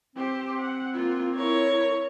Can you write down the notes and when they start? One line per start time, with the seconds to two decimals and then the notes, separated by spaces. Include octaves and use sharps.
0.16 C4 G4 C5
0.59 F#5
0.93 A#3 F4
1.36 E4 A#4 C#5